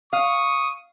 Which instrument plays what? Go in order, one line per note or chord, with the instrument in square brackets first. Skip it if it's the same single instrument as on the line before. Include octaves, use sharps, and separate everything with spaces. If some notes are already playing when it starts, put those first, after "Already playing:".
[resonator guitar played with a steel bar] F5 [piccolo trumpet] C#6 [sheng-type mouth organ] D#6